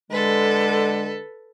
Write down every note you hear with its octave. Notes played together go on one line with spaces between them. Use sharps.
D3 G#3 A4 B4